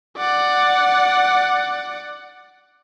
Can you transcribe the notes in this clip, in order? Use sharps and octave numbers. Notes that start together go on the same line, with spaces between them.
D5 F#5